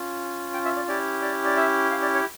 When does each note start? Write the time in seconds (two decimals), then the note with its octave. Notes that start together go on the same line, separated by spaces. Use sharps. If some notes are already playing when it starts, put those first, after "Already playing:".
Already playing: C#4 F4
0.53 G5
0.65 E5
0.76 D5
0.88 C#4 E4 G4 D5
1.22 D5
1.45 D5
1.57 E5
1.91 F5
2.02 D5
2.14 C#5